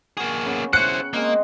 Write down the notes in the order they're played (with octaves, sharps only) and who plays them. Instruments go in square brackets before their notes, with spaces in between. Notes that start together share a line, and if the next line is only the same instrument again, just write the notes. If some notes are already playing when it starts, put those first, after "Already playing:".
[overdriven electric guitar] A#3 G#4 [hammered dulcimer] F#4
[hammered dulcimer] C#3 B3
[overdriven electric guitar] E4 C5 [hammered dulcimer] G5 [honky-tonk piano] F#6 C#7
[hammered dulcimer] G#3 C4 D#5 [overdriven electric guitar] A#3